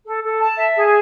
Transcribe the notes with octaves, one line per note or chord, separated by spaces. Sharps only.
A4
A4
A5
E5
G#4